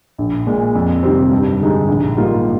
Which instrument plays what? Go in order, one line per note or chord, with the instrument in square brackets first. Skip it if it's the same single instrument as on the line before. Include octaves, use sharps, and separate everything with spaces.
[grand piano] A#1
A#2 G#3
F2
C3 D#3 G3 C4
G2
D3 G#3 D#4 G4
A#1
G#2 G3 A#3 F4